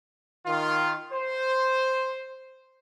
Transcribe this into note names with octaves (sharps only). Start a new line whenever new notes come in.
D#3 F4
C5